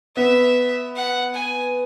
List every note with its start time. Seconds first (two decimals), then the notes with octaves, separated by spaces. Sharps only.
0.16 B3 E5
0.96 F#5
1.35 G#5